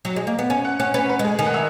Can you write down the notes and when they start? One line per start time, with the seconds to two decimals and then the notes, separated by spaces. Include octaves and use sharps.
0.05 F#3
0.16 G#3
0.27 A#3
0.39 B3
0.50 C#4 G#5
0.65 F#5
0.80 C#4 F#5
0.94 C#4 B4
1.09 B4
1.19 G#3
1.25 G#4
1.39 D#3 G#5
1.46 F#5
1.54 E5